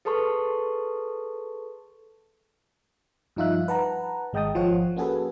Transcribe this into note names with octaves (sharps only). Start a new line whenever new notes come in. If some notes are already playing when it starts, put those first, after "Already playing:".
G#4 A4 B4 A5 C6 C#6
G2 F3 D#4 F4 E5 F#6
B4 F#5 A5 A#5
G#1 G#3 D#5 G5 A5 D#6
G#1 F3 F4 C#5 F#5
A#3 C#4 F#4 G#4 A4 B4